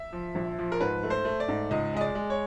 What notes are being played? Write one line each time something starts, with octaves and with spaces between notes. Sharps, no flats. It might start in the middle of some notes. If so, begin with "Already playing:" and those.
Already playing: E5
F3
A#1
F3
A#4
G#2 B4
A3
C5
A3
D5
G#2
C#2 D#5
G#3 D#5
D5
G#3
C#5